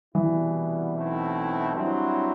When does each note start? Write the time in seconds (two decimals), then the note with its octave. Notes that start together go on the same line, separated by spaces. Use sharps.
0.15 C2 B2 E3 G3 B3 E4
0.95 B1 B2 A3 C4 E4
1.74 G2 F#3 C4 E4